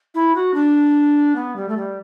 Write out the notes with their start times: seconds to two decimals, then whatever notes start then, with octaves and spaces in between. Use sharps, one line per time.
0.14 E4
0.35 F#4
0.54 D4
1.35 B3
1.56 G3
1.68 A3
1.77 G3